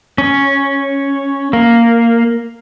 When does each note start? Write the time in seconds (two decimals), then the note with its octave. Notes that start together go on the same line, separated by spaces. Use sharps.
0.18 C#4
1.53 A#3